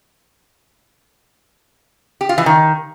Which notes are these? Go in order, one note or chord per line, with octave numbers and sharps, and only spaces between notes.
G4
F4
E3
D#3